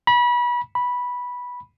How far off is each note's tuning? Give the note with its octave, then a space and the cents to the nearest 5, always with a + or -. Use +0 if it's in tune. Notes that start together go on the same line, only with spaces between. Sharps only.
B5 -30
B5 -10